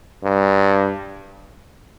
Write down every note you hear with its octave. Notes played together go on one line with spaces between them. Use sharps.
G2